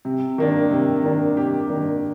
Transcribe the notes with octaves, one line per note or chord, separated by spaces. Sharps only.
C3
D#3 A#3 D4
C3
D#3 A#3 D4
C3 G4
D#3 A#3 D4